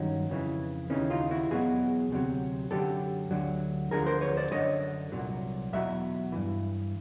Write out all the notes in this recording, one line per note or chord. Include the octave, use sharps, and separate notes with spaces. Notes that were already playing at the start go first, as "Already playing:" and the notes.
Already playing: G2 D#3 F#3 C#4 D#4
F2 C#3 E3
D#2 C#3 E3 C#4 D#4
D#4 F4
E4 F#4
E2 B2 F#3 F#4 G#4
D2 C3 D#3 F#3
F#2 D3 F#3 G4 A4
D2 D3 F#3
D2 D3 F3 G#4 A#4
A#4 C5
B4 C#5
C5 D5
F#2 D3 F3 C#5 D#5
C2 A#2 F#3
E2 B2 F#3 E5
G2 E3